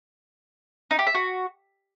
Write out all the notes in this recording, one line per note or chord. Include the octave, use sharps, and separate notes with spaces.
D#4
G4
E5
F#4